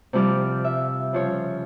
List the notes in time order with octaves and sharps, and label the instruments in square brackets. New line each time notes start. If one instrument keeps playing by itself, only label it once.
[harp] C3 F3 G3 D6 F6
E5
C#3 F3 C#5